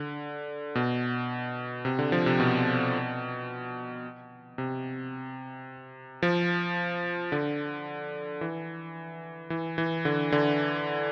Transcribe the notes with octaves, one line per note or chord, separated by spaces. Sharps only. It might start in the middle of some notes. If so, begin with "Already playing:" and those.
Already playing: D3
B2
C3
D3
F3
C3
B2
C3
F3
D3
E3
E3
E3
D3
D3